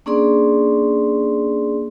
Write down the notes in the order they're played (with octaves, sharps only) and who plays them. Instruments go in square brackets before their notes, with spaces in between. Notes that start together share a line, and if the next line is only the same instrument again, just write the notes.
[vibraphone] A#3 C#4 D4 G#4 D5 C6